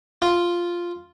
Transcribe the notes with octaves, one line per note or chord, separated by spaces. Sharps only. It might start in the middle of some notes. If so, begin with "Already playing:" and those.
F4